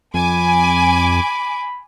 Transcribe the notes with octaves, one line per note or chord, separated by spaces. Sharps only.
F2 G#5 B5 D6